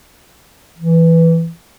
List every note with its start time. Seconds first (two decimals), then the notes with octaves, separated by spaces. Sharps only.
0.78 E3